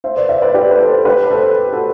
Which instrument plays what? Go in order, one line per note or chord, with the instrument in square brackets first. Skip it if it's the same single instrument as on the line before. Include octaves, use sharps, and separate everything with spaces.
[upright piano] C5 E5
B4 D5
C5 E5
B4 D5
G4 B4
B4
A4 C5
G4 B4
A4 C5
F#4 A4